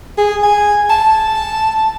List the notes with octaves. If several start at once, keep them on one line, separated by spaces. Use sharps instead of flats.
G#4
G#5
A5